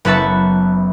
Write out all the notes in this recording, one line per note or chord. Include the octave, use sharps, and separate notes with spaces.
F#1 B3 B4 E5 A5 C#6